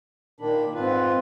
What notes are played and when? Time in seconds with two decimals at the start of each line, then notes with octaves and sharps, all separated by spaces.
0.40 A#2 D#3 D4 B5
0.75 G#2 C4 F4 B4